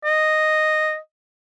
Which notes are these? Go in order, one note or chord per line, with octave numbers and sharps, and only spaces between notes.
D#5